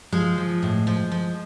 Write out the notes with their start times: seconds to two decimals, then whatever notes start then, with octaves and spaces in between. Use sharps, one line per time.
0.12 F3 G#3
0.38 F3
0.63 A2
0.87 F3
1.12 F3